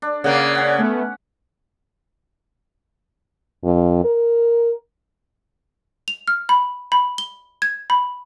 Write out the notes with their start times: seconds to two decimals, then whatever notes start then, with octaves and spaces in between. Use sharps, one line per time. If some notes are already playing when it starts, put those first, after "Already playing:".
0.02 D4
0.24 C#3 A#3 D5 F#5
0.55 C#4 F#5
0.78 A3 B3
3.64 F2
4.04 A#4
6.08 F7
6.28 F6
6.49 B5
6.92 B5
7.18 G7
7.62 G#6
7.90 B5